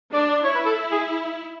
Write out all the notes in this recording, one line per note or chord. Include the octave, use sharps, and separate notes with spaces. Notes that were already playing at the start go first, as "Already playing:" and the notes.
D4 D5
D5
E4 C#5
B4
A4
G#4